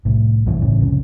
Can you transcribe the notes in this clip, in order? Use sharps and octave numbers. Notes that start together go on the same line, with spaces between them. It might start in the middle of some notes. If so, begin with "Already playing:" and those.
C2 A2
C2 G2 B2 E3
G1 A2 C#3 E3
C2 F2 C#3